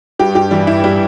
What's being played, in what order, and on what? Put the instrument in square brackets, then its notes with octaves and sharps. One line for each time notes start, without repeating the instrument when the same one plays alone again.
[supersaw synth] G2 [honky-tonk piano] G4
[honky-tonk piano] G4
[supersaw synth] E3 [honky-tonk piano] G3
[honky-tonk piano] E4
G3